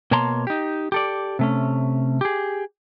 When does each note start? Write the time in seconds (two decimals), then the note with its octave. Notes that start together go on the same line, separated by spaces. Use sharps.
0.11 B2 A#3 C#5 A5 A#5 C6
0.47 D#4 G4
0.92 G4 A4 D5
1.39 C3 A3 C#4
2.21 G4 G#4